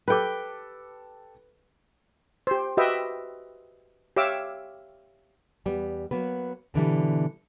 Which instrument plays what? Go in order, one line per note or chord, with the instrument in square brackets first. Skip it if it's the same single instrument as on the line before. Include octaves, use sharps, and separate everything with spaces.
[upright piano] G4 A4 D6 [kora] B4 G5
[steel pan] G4 C5
F#4 G4 B4 D#5 E5 G5
G4 C#5 E5 F5 D6 E6
[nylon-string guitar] E2 G3 B3
F#3 A#3 B3 B4
B2 D3 E3 G3